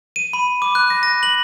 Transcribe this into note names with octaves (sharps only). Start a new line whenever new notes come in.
D#7
B5
D6
F#6
A#6
A#6
F#7